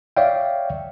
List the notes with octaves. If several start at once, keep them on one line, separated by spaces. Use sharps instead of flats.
C#5 D5 E5 F5 G5